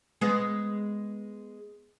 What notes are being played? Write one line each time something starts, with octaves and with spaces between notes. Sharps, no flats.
G#3 B3